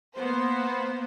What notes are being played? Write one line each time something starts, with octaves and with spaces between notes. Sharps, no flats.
A#3 B3 C5